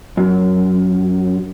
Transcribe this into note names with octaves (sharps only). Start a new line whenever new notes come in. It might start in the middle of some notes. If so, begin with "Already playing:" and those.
F#2